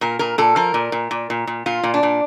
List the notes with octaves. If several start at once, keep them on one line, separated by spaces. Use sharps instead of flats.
A#2 A#4
A#2 A#4
A#2 A4
F3 A#4
A#2
A#2
A#2
A#2
A#2
A#2 F4
A#2
D4
A#2